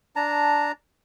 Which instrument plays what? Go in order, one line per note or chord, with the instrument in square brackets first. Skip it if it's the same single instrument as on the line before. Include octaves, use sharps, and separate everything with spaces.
[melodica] D4 A5 A#5